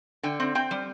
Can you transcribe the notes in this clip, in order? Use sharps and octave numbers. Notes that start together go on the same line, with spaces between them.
D3 G5
C4
C4 G5
G3